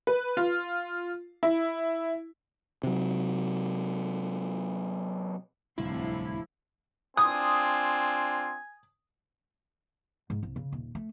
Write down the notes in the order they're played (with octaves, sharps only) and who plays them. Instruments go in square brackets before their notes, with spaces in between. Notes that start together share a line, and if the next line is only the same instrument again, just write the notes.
[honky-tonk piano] B4
F4
E4
[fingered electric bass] C3 F#3
[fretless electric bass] D1 [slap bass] C2 [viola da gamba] A2 C3 F3 [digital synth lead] E4
[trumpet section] C4 D4 F4 [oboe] G#5 [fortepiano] D#6
[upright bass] G#2
C2
C#3
D#1
A3